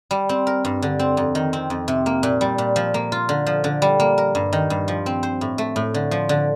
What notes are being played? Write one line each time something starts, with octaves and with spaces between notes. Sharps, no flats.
G3
C4
A#4
G2
D3
C4
F2
D#3
C4
F2
C3
A#3
A#2
G3
A#2
F3
A#3
F4
D3
F3
D3
G3
A#3
A#4
G2
D#3
G2
F3
C4
C5
A2
A3
A2
D3
F3
D3